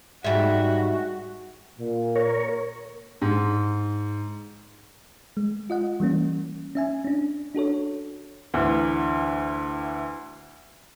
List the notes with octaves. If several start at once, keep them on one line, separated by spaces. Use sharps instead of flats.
G#2 G3 F#4 E5
A#2
A#4 C#5
G#2
G#3
F4 D#5 F#5
E3 G3 A#3 C#4
C#4 E5 G#5
C#4 D4
D4 F#4 A4 C#5
D2 D3 E3